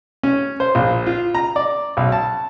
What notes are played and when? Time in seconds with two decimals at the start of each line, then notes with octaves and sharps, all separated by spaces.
0.23 C#4
0.60 C5
0.75 A#1
1.06 F4
1.35 A#5
1.56 D5
1.97 B1
2.12 A5